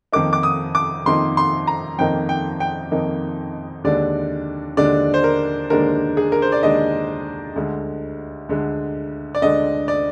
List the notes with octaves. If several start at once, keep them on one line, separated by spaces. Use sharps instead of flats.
F2 D#3 A#3 D#4 D6
D6
D#6
D6
F2 D#3 A#3 D#4 C6
C6
A#5
F2 D#3 A#3 D#4 G5
G5
G5
F2 D#3 A#3 D#4
D#2 D3 G#3 D4 D5
D#2 D3 G#3 D4 D5
C5
A#4
D#2 D3 G#3 D4 A#4
G#4
A#4
C5
D5
D#2 D3 G#3 D4 D#5
D2 D3 G#3
D2 D3 G#3
D5
D2 D3 G#3 D#5
D5